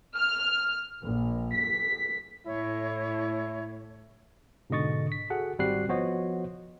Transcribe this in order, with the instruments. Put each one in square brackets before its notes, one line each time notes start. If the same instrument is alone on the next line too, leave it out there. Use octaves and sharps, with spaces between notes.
[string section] F6
A#1
B6
[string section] A2 [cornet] E4 [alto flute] C#5
[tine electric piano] G#2 B2 D3 D#5 C#6 A6
B6
F#4 G#4 A4 F#5
G#1 G3 C4 F#4 F#6 C7
F3 B3 F#4 C5 C#5 D#5